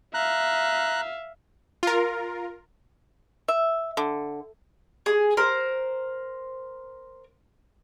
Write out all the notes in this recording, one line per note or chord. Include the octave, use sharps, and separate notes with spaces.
E5 F5 A#5 F#6
F4 A#4
E5
D3
G#4
A#4 C5